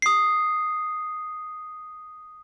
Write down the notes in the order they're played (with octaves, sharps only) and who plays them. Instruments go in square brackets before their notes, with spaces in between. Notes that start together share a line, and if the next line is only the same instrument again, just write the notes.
[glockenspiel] D#6 C7